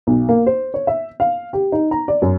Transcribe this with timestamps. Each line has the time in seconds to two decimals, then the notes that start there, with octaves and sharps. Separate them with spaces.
0.07 B1
0.29 A#3
0.46 C5
0.74 C#5
0.87 E5
1.20 F5
1.53 G4
1.72 D#4
1.91 A#5
2.08 D5
2.22 F#2